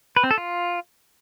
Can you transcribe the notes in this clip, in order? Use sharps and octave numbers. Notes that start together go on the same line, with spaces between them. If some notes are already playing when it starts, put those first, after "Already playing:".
B4
C4
A4
F4